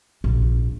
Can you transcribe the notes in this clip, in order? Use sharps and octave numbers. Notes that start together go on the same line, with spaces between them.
A#1